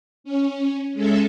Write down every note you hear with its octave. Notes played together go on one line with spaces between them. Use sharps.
C#4
G#3 C#4 A4 E5